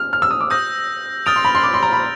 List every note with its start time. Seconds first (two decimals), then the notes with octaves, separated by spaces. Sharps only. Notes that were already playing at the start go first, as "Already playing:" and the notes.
Already playing: F6
0.13 F6
0.22 E6
0.31 D#6
0.41 D6
0.50 D#6 E6 G6 A#6
1.26 D#6 F6 A6 D7 F7
1.36 C6
1.45 B5
1.55 C6
1.63 D6
1.74 C6
1.83 A#5
1.93 B5